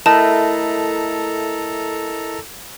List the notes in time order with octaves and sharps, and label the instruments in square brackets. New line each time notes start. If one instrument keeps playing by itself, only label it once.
[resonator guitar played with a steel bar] A3 [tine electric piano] E4 A#4 D#5 [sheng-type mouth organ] A4 A#5 [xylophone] A5